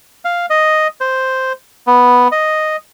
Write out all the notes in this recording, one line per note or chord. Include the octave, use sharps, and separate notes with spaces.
F5
D#5
C5
B3
D#5